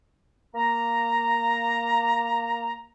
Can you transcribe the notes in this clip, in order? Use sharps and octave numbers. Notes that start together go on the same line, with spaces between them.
A#3 A#5